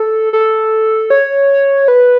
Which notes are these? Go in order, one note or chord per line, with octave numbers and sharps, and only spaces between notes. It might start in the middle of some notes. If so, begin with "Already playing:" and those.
Already playing: A4
A4
C#5
B4